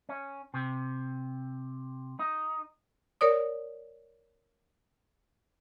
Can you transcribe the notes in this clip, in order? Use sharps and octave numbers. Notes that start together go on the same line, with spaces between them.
C#4
C3
D#4
A#4 C#5 D5 D#6